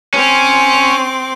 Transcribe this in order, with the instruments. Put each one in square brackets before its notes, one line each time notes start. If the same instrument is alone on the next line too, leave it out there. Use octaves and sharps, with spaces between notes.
[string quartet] C4 C6 D6 [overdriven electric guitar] C#4